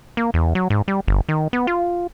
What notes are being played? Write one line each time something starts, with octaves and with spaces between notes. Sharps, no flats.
A#3
E2
F#3
G#2
G3
G1
D#3
B3
F4